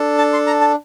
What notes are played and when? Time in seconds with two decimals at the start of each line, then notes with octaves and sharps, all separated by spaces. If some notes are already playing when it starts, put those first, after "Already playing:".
Already playing: D4 A4
0.18 A5
0.33 C6
0.47 A#5
0.61 A5